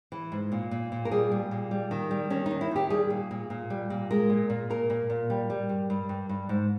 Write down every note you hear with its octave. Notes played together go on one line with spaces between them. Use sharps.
E3
G#2
A#2
A#2
A#2
A#4
G3 G#4
G3
A#2
G3
D#3
G3
D#3 C#4
D#2 D#4
E4
D#3 G4
G3 G#4
A#2
A#2
A#2
G3
A#2
G#3 A#4
A#2
A#2
A#2 A#4
A#2
A#2
G3
G3
G2
G2
G2
G2
G#2